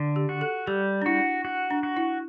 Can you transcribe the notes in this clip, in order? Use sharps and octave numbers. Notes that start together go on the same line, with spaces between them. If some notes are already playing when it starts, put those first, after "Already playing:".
Already playing: D3
G4
F#4
A4
G3 G4
D4
E4 F#4
F#4
D4
F#4
E4